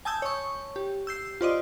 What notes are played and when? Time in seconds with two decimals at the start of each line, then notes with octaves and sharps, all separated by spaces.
0.05 G#5 A5 D#6 E6 G6
0.22 C#5 C#6
0.76 G4
1.07 E6 G6 C7
1.41 F4 C5 D5 D#5